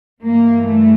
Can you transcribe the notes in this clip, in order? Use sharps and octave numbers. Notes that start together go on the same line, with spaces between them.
G2 E3 A#3
A3